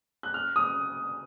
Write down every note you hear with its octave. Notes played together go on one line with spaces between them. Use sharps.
F#6
F6
D#6